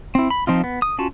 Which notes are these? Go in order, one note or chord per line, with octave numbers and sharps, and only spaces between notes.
C4 E4
B5
F3 C4 D#4 F4
B3
D#6
C#4 F4 F#4 A5